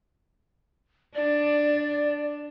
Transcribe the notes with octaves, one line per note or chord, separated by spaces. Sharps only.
D4 D5